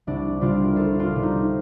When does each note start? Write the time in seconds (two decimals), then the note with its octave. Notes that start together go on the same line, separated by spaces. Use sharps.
0.07 C2 D4
0.41 C3 G3 D4 F4
0.65 A#4
0.76 C2 F4 A4
0.99 D4 F4
1.11 C3 G3
1.23 D#4